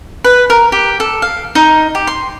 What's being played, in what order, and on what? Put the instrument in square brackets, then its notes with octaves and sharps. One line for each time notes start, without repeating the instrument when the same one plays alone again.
[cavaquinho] B4
A#4
G4
A4
F5
D#4
G4
C6